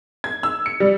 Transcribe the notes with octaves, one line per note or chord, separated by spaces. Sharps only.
G#6
E6
C#7
G3